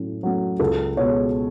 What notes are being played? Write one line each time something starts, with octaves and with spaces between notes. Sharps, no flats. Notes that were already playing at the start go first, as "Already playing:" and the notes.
Already playing: A2 F#3 A3 C#4
F#3 A3 C#4
C#2 A4
B2 G#3 B3 C#5